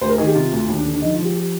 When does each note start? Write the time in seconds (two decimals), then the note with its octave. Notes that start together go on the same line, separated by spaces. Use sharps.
0.01 D2 C5
0.09 A#4
0.18 D#3 G#4
0.26 G4
0.35 C3 F4
0.52 D2
0.68 D#2
0.77 D4
0.85 D3
0.93 D4
1.02 F3 D#4
1.13 F4
1.19 F3
1.24 G4
1.35 G4